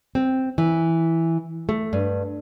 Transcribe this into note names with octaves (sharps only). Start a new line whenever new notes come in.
C4
E3
A3
G2